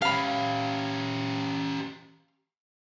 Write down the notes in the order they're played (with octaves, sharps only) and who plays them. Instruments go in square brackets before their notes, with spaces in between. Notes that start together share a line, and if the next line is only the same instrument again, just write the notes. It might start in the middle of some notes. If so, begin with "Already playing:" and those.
[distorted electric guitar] C#4 G4 [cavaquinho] F5 B5